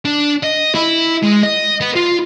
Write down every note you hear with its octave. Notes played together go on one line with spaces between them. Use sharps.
D4
D#5
E4
G#3
D#5
B3
F4